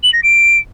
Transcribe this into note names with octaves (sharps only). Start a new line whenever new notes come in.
F#7
A#6
D7